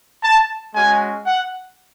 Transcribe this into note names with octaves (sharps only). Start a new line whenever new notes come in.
A5
G#3 C#4 F#4 G#5
F#5